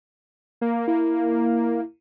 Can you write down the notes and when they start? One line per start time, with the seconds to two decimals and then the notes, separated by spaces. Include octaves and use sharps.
0.61 A#3
0.88 A#3 E4